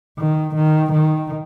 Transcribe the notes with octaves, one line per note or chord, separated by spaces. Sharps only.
D#3
D#3
D#3